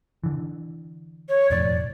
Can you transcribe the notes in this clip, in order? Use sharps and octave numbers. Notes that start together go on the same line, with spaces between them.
D3 E3
C#5
E1 F2 A2 D5